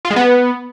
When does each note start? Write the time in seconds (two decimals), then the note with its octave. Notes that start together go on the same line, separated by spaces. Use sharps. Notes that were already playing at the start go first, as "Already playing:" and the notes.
0.05 F4
0.10 G#3
0.16 B3